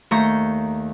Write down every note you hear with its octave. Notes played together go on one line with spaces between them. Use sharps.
D#2 A3 A#5 C#6 G6